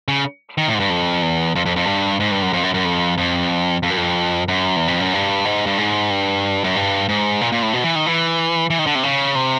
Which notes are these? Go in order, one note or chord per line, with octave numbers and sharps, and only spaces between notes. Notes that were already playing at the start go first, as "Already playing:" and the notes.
C#3
D#3
A2
G#2
G2
F2
E2
F2
F2
F2
G2
G#2
G2
F#2
F2
F#2
F#2
F2
F2
F2
F#2
F2
F#2
E2
F2
F#2
G2
G#2
G2
G#2
G2
F#2
G2
G#2
A#2
A#2
A2
B2
E3
D#3
E3
E3
D#3
D3
C3
C#3
C3